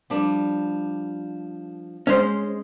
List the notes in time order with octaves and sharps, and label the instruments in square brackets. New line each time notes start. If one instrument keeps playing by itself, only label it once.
[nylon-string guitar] F3 G3 D4
[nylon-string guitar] G#3 D#5 [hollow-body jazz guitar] C#4 C5